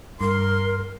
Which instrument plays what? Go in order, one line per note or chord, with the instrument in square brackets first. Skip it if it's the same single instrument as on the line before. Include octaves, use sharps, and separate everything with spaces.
[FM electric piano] G2 [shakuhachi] A#4 [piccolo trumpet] C6